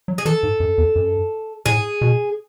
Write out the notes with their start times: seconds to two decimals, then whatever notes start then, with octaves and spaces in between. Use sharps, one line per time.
0.08 F#3
0.18 G#4
0.25 E3 A4
0.43 G#2
0.60 F#2
0.78 E2
0.96 F#2
1.66 A2 G#4
2.01 B2